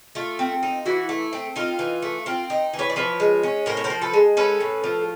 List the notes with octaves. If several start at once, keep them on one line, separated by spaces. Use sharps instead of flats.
A3 F4
C4
D#4
E3 E4 F#4
A3
C4
D#4 F4
E3
A3
C4 F4
D#4
E3
B4 C#5
D5
F3 B4 C#5
G#3
C#4
A2 A#4 C5
C#5
A#4 C5
F3
A4 B4
G#3
C#4 A4 B4
A2
F3